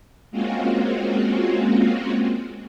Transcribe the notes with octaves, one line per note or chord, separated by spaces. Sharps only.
G#3 A#3 C4 C#4 F4 F#4